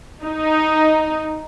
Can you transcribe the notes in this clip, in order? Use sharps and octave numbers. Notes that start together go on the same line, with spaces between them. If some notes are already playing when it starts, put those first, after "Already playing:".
D#4